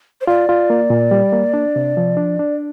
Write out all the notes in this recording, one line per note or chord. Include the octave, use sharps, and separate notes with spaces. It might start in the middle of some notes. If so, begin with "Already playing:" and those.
C5
F4 D5
F4
A#3
A#2
G3
A#3
D4
C3
F3
D4
D4